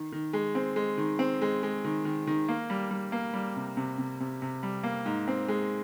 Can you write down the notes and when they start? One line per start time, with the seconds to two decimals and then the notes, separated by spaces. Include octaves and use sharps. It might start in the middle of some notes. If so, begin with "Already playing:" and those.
Already playing: D#3
0.12 D#3
0.33 G#3
0.55 C4
0.76 G#3
0.98 D#3
1.19 C4
1.42 G#3
1.63 G#3
1.84 D#3
2.05 D#3
2.27 D#3
2.48 A#3
2.70 G3
2.91 G3
3.12 A#3
3.34 G3
3.56 C3
3.77 C3
3.98 C3
4.20 C3
4.42 C3
4.63 G3
4.84 A#3
5.06 G#2
5.28 C4
5.48 G#3